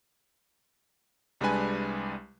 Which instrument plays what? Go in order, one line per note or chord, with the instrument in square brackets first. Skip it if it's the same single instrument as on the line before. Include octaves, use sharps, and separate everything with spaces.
[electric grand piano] C2 G3 G#3 D4 B4 G#5